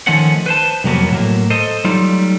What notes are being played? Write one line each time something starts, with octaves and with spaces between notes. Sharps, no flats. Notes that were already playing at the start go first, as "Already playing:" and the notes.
D#3 F3 A3 C#4 F#5
B4 C5 A5
C2 F2 F#3 A#3 B3
A2 F#3 A#3
A4 C5 D#5
F#3 G3 A3 D#4 F4